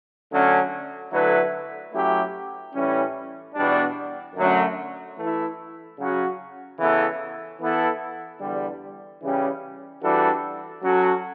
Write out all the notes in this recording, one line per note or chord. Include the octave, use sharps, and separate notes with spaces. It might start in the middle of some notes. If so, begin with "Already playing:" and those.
D3 F#3 A3 C#4
D3 F#3 A3 E4 B4
F#3 A3 C#4 E4 G4
A2 E3 G3 C#4
E2 B2 G3 D4
F#2 D3 F#3 A3 C#4
E3 A3 E4
C#3 F#3 C#4 F#4
C#3 E3 B3 E4 A4
E3 B3 E4 A4
E2 D3 G3
C#3 E3 G3 C#4 G4
E3 G3 D4 F#4 A4
F#3 C#4 F#4 A4